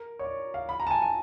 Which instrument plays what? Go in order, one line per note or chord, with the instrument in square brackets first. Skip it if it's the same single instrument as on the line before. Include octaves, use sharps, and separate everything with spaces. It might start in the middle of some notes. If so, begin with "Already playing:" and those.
Already playing: [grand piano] A#4
C#5
D5
F5
B5
A#5
A5
G#5
G#5